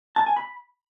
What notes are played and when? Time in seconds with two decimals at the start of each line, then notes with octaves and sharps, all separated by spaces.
0.16 A5
0.26 G#5
0.36 B5